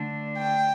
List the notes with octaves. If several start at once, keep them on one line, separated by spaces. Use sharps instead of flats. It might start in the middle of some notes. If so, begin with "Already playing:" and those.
Already playing: D3 A3 D4
G5